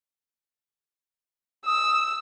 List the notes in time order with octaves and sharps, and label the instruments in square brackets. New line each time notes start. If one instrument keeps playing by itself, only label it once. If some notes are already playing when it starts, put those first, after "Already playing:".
[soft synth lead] D#6 [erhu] E6